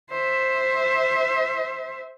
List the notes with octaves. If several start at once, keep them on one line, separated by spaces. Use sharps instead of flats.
C5 E5